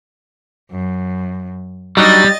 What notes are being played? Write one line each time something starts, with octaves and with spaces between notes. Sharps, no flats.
F#2
F#3 G3 D4 D#4 D#5 A6